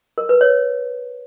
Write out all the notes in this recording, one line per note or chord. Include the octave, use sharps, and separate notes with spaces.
A#4
B4
C#5